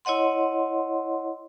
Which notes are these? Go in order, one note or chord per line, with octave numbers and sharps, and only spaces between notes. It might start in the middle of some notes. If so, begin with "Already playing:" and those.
E4 C#5 D#5 F#5 C6